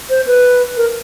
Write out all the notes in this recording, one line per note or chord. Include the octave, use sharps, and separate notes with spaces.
C5
B4
A#4